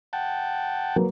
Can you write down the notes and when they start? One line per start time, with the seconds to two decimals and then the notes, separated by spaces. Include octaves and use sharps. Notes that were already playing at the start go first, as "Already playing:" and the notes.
0.13 F#5 G5 A5
0.96 F#3 A#3 B4